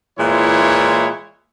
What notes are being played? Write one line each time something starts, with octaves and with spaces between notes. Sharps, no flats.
A#2 E3 G#3 E4 C#5